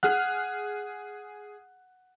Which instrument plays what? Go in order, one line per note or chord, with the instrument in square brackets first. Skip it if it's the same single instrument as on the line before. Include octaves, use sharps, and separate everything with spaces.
[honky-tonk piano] G#4 F6 F#6 [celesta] F#5